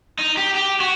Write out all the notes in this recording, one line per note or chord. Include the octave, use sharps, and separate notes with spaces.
D#4
G4
G4
F#4